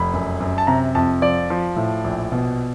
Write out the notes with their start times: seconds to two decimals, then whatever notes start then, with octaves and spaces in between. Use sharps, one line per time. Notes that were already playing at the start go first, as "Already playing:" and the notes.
Already playing: F1 B5
0.13 F#2
0.40 F#2
0.58 A5
0.67 C3 A#5
0.95 F2 A5
1.22 F3 D5
1.50 F3
1.76 A2
2.04 A#1
2.32 B2